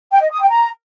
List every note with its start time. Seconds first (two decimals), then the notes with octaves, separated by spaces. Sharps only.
0.12 G5
0.21 D#5
0.31 D#6
0.40 G5
0.50 A#5